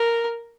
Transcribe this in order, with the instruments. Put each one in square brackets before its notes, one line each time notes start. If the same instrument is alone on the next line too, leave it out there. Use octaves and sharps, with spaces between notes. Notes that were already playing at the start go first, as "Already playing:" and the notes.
Already playing: [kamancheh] A#4